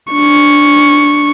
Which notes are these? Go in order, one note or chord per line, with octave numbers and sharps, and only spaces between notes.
D4 C#6